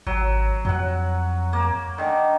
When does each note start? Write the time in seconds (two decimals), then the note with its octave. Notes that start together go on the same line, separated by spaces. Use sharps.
0.07 G#1 F#3
0.65 F2 F#3 F#5
1.53 A#3
1.98 D3 D#3